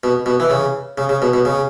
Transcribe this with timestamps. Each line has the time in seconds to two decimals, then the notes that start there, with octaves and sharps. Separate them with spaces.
0.04 B2
0.26 B2
0.40 E3
0.50 C#3
0.98 C#3
1.09 C#3
1.22 B2
1.34 B2
1.45 C#3